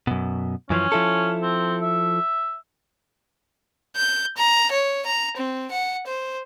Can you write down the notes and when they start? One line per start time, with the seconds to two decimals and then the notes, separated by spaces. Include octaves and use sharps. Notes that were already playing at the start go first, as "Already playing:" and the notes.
0.07 F#2 B2
0.70 F#2 E3 F3 C#4
0.92 F3 E4 A4
1.42 C4
1.82 E5
3.96 G6
4.37 A#5
4.71 C#5
5.06 A#5
5.37 C4
5.71 F#5
6.07 C5